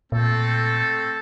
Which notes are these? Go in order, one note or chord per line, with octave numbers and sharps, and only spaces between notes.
A#2 A3 C4 A4